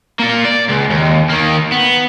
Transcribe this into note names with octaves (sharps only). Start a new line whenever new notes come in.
A#3 F4
D5
C#2
D#2
D#3 A#3
B3